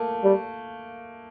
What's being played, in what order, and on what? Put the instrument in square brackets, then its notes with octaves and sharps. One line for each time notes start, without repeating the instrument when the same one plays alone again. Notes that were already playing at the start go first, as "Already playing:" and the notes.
Already playing: [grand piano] A3 A#3
[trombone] G3